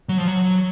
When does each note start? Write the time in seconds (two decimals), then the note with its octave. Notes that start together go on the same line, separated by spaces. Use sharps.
0.09 F#3
0.18 F3
0.28 F#3